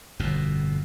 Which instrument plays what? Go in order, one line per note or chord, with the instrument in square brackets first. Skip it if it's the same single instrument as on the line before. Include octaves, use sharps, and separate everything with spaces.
[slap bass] G1 F2 B2